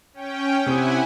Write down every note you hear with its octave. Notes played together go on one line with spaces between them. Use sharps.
C#4 G5
C3 C4 E4 F#5 G#5 D#6